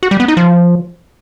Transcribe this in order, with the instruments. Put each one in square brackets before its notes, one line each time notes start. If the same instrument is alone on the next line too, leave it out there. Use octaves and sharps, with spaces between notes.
[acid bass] F#4
G3
B3
D#4
F3